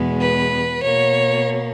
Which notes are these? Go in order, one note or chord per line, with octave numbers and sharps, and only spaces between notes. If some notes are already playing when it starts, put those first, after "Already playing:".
Already playing: E2 B2 G#3 B3
B4
B2 A#3 C#5